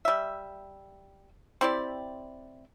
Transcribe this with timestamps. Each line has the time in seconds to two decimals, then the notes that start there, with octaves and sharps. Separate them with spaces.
0.05 G3 E5
1.61 C4 E4 G4 D5